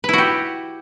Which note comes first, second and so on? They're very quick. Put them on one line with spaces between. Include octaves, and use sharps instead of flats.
B4 E4 F#4 G4